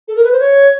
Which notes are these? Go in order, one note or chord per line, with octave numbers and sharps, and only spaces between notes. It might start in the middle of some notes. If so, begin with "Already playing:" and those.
A4
A#4
B4
C5
C#5